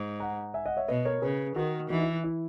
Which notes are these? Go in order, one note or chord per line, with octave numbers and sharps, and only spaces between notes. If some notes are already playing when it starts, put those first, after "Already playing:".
Already playing: G#2
F#5 A#5
E5 G#5
D#5 F#5
C#5 E5
B2 B4 D#5
A#4 C#5
C#3 G#4 B4
D#3 F#4 A#4
E3 D#4 F#4
E4
E4
E4